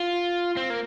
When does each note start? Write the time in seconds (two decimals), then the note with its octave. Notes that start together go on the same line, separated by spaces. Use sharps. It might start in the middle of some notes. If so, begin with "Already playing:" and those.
Already playing: F4
0.57 C4
0.70 A#3